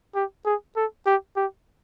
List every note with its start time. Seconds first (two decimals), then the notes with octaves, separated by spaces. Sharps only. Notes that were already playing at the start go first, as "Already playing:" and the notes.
0.15 G4
0.45 G#4
0.76 A4
1.06 G4
1.36 G4